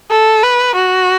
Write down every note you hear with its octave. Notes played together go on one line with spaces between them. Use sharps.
A4
B4
F#4